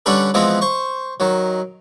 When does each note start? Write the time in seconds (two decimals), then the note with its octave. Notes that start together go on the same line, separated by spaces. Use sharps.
0.06 D3 G3 C#4 A4 B4 D5
0.34 E3 F3 G#3 B3 C4
0.61 C5 C#6
1.20 D#3 F#3